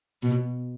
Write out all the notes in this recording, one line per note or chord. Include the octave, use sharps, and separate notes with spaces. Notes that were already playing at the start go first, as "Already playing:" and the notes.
B2